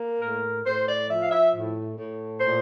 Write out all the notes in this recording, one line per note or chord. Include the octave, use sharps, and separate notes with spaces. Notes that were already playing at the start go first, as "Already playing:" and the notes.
Already playing: A#3
A2 A#4
A2 C5
D5
F3 E5
F5
E5
A2
A2
A#2 C5